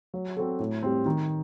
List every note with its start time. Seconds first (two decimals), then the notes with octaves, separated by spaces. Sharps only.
0.14 F#3
0.37 C4 F#4 A4
0.59 A2
0.83 G3 C4
1.06 D#3